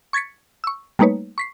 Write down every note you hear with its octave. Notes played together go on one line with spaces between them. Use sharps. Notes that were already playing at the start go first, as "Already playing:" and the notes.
C#6 G#6 A6 B6 C#7
C#6 E6
G3 A3 A#3 D#4 B4 C#5
C#6 B6 C7